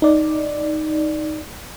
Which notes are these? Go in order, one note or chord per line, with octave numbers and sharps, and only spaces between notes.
D#4 D5